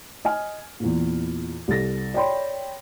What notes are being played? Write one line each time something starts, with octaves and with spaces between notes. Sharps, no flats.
D#5 G#5 F6
E2 A#2
C2 A4 A6 A#6
C#5 D5 G5 B5 C6